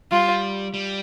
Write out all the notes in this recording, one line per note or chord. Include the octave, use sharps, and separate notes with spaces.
G3 F4
G3